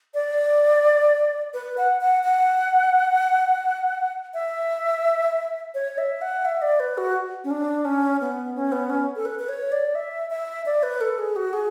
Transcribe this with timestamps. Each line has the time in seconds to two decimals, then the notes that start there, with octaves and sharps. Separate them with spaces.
0.14 D5
1.54 B4
1.77 F#5
2.01 F#5
2.23 F#5
4.34 E5
5.75 C#5
5.98 E5
6.22 F#5
6.45 E5
6.62 D5
6.80 B4
6.98 F#4
7.44 C#4
7.51 D4
7.85 C#4
8.21 B3
8.56 C#4
8.72 B3
8.90 C#4
9.16 A4
9.25 B4
9.39 B4
9.49 C#5
9.72 D5
9.95 E5
10.30 E5
10.66 D5
10.83 B4
11.01 A4
11.18 G#4
11.36 F#4
11.53 G#4